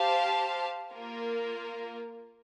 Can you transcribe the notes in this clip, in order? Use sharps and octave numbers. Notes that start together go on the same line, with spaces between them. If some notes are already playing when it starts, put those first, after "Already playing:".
Already playing: G4 C5 F5 A5
A#3 F4 A#4